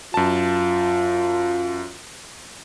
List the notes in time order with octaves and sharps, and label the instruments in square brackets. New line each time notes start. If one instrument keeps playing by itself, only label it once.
[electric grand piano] F#2 A5 [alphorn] F4